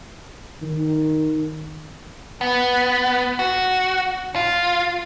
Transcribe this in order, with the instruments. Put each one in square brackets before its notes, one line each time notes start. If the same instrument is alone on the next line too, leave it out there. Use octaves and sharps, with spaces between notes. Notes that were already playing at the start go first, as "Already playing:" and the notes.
[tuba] D#3
[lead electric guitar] B3
F#4
F4